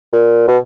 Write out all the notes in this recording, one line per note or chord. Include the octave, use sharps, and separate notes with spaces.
A#2
B2